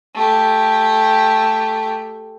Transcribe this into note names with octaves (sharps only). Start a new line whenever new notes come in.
A3 G4